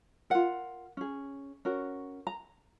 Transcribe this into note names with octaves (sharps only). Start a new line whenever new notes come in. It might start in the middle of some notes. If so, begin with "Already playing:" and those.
F4 A#4 F#5
C#4 G#4
C#4 F#4 A#4
A#5